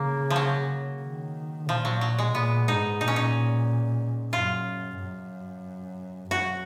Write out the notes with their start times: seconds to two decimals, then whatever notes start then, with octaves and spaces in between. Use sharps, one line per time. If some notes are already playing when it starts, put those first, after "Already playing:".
Already playing: C#3 A#3
0.30 F3
0.36 F#3
1.02 D#3
1.68 A#2 F3
1.85 F#3
2.01 F#3
2.19 G#3
2.34 A#2 B3
2.68 G#2 D#4
3.00 A#2 D#4
3.08 C#4
3.16 D#4
4.33 F#2 F4
4.99 F#2
6.31 F#2 F#4